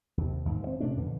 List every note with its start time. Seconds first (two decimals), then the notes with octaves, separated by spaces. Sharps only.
0.17 D#2 C3
0.45 D#2 G#2
0.63 E3 C4
0.80 C3 A3 C#4 D4
0.96 F2 A#2 D3 E3